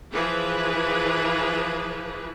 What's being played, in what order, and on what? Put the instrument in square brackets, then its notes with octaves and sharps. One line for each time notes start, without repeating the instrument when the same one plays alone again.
[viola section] E3 F3 G#4 B4